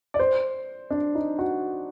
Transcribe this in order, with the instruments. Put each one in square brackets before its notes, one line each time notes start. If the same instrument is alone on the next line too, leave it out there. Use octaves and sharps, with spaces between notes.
[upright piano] D5
C5
D4
D#4
F#4